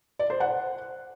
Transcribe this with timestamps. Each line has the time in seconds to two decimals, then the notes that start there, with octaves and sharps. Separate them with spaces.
0.19 D5
0.30 C5
0.40 F#5